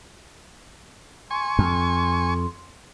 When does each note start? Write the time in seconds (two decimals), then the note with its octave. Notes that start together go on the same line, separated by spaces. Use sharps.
1.31 G#5 C6 C#6
1.59 F2